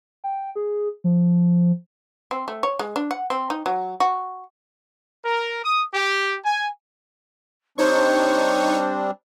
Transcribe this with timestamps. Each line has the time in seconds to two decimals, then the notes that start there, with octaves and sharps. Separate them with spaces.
0.24 G5
0.56 G#4
1.04 F3
2.31 C4
2.48 A3
2.63 C#5
2.79 G#3
2.96 D4
3.11 F#5
3.30 C4
3.50 D#4
3.66 F#3
4.00 F#4
5.24 A#4
5.63 D#6
5.93 G4
6.44 G#5
7.78 G3 C4 D4 D#4 C5 C#5 C#6